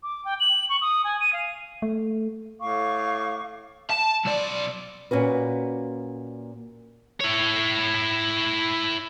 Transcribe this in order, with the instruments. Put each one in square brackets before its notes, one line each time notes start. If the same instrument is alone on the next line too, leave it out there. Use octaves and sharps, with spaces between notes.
[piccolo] D6
G5
F#7
C#6
D#6
G#5
D#7
F5
[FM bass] A3
[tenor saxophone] A2 [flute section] F5 C#6 D6
[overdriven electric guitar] A5
B1 D5
[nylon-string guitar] A#2 C#4 F#4 B4
[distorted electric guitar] E4 C#5